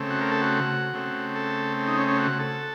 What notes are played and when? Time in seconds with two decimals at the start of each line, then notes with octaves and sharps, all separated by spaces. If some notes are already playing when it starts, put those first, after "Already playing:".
Already playing: C#3 A3 C4
0.10 F#4
0.21 A#4
0.32 A4
0.41 F#4
0.93 C#3 A3 C4
1.35 A4
1.87 D#4
1.97 C#4
2.08 C#4
2.19 F#4
2.39 A4